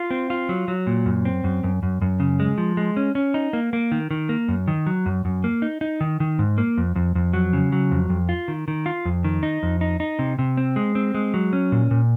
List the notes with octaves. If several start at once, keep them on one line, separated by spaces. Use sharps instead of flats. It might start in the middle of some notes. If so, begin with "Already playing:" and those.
Already playing: F4
C4
F4
F#3
F#3
A#2
F#2
C4
F#2
F#2
F#2
F#2
C#3
G#3
F3
G#3
C#4
C#4
D#4
A#3
A#3
D#3
D#3
A#3
F#2
D#3
F#3
F#2
F#2
A#3
D#4
D#4
D#3
D#3
G#2
A#3
F2
F2
F2
F#3
C#3
F#3
F2
F2
F4
D#3
D#3
F4
F2
D#3
D#4
F2
D#4
D#4
C3
C3
C4
G#3
C4
G#3
F#3
C#4
A#2
A#2